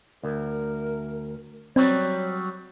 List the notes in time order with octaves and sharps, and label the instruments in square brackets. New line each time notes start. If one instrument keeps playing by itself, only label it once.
[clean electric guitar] D2 [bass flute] A#4
[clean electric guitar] F#3 G3 [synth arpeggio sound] C4 [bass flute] C#5